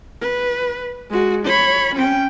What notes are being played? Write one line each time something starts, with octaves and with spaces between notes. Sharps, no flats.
B4
G#3 F#4
C#5 B5
C#4 G5